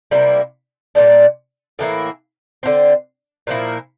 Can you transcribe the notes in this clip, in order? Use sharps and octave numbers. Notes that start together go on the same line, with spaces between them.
C3 G3 A#3 E4
A#2 G3 D4
A2 E3 A#3 E4
D3 F3 C4
A#2 F3 A#3 E4